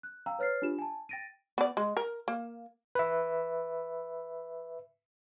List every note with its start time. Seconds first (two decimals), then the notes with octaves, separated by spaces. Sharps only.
0.03 F#6
0.26 F5 G5 A#5 E6
0.39 B4 C#5 F6 A6 C7
0.62 D4 F4 G4 E7
0.79 G#5 A5
1.09 G5 A6 A#6 D7 D#7
1.58 B3 D5
1.77 G#3
1.97 A#4
2.28 A#3
2.95 B4 E5